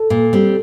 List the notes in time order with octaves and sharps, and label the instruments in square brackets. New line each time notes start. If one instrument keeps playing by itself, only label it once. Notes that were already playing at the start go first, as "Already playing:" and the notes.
Already playing: [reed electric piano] A4
[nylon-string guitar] A#2
G3 C4